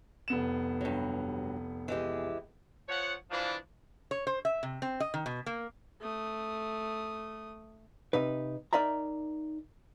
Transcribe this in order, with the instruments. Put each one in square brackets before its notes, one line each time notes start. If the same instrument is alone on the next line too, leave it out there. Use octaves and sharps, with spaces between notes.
[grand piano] F1 B3 E7
[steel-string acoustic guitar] G2 F#3
E3 G#3 G4
[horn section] F3 C#5 F#5
E3 F3 D4
[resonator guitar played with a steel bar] C#5
C5
E5
C3
C4
D#5
D#3
B2
A#3
[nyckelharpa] A3 D#6
[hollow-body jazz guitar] C3 D#4 B4
D#4 A#4 D5 E5 A#5